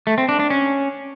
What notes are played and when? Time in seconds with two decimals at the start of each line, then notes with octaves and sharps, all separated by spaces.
0.07 A3
0.18 C4
0.29 D4
0.40 D4
0.50 C#4